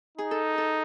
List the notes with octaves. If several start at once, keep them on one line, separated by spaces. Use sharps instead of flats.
D#4 G#4
A4
A4